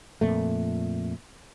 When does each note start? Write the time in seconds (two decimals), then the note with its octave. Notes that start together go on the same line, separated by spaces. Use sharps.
0.21 F2 A#2 A3